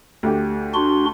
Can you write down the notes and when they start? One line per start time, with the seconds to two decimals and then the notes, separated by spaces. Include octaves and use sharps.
0.23 D2 G4
0.74 D4 F#4 C6